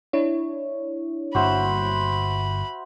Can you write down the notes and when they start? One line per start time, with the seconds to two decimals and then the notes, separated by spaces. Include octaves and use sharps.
0.13 D4 E4 C#5
1.35 G1 G2 A#3 F#4 C5 E5 B5